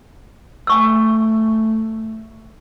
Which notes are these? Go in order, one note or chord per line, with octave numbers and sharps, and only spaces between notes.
A3 G#5 C#6 E6